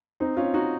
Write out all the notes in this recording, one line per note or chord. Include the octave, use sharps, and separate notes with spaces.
C4 D#4
C#4 F4
D#4 F#4